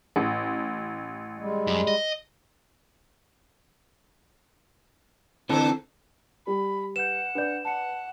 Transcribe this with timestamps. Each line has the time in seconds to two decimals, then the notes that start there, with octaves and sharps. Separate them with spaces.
0.16 A1
1.38 G3 G#3
1.67 F#2
1.87 D#5
5.49 D3 E3 C4 A4 C5
6.47 G3 B5
6.96 B4 F#5 G6 E7
7.35 D4 B4 D5 G6
7.65 F#5 A5 C#7